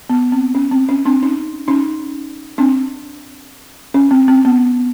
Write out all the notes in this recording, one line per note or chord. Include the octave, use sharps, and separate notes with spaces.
B3
C4
C#4
C4
C#4
C4 D4
C#4 D#4
C#4 D#4
C4 D4
C#4
C4
C4
B3